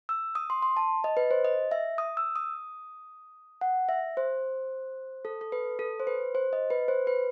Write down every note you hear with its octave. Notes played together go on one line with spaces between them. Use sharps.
E6
D#6
C6
C6
A5
D#5
B4
C5
D#5
E5
D#6
E6
D#6
F#5
E5
C5
A4
A4
B4
A4
C5
B4
C5
D#5
B4
C5
B4